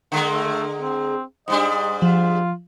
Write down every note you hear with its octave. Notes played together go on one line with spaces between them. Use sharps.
D3 G#3 A#3
A3
C4
G#2 G3 D4 D#5
F3 F4